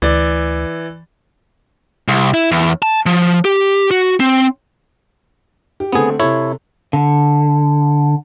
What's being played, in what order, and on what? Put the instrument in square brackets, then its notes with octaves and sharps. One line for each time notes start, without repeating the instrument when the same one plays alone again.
[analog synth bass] D2 [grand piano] E3 D5
[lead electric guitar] C2
E4
E2
A5
F3
G4
F#4
C4
[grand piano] G4
[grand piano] D3 A3 C4 [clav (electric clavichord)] B3 G#4
[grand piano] C3 A4 [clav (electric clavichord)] E4 C#5
[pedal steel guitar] D3